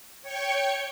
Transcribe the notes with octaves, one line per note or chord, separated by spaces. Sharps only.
C#5 G5 C#6